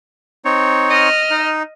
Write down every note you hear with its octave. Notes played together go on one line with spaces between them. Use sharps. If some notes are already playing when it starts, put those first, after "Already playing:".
C4 D#4 C#5
D#5 F6
D#4